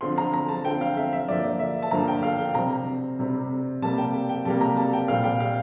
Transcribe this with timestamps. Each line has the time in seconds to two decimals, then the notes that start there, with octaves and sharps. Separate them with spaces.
0.01 D3 F3 C4 C6
0.18 A#5
0.34 A#5
0.49 A5
0.64 D3 F3 C4 G5
0.81 F5
0.97 E5
1.13 E5
1.28 G2 D3 F3 A#3 D5
1.59 E5
1.83 A5
1.91 G2 D3 F3 A#3 A#5
2.08 G5
2.23 F5
2.39 G5
2.55 C3 G3 C4 A#5
3.19 C3 G3 C4
3.82 C3 G3 A#3 A5
3.98 G5
4.29 G5
4.45 C3 G3 A#3 A5
4.61 A#5
4.77 A5
4.93 G5
5.08 A#2 G3 C4 F5
5.24 G5
5.40 F5